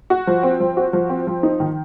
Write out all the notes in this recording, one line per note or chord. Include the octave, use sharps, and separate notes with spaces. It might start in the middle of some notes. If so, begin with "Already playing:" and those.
F#4
F3
C4
F3
F#4
F3
C4
F3
D#4
D#3